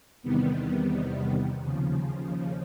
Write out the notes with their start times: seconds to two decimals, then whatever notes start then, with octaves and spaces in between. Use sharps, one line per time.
0.23 E2 C3 D#3 G3 B3
1.60 D#2 C#3 F3